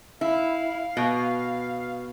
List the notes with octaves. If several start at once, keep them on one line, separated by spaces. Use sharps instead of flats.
E4 F5
B2